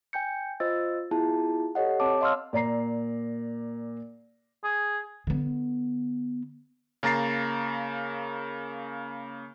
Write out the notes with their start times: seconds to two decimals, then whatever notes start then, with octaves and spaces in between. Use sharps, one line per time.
0.13 G5 G#5 G6 C#7
0.60 F4 C5 D#5 E6 A6
1.11 B3 E4 F4 G#4 A5
1.75 G4 A4 C#5 D#5 F#5
2.00 C4 C#5 A5 D6
2.21 D#5 F5 C6 D6 E6 F6
2.53 A#2 D5 A#5 C7
4.64 G#4
5.27 D3 B3
7.03 C#3 A#3 A#5 A6 C7